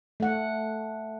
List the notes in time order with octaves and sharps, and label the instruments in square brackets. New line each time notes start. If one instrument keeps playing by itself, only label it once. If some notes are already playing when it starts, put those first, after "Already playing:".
[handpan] A3 F#5